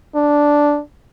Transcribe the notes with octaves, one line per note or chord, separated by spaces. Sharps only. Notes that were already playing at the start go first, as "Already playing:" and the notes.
D4